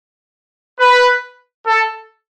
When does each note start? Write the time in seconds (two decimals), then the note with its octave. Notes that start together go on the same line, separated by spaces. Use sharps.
0.80 B4
1.67 A4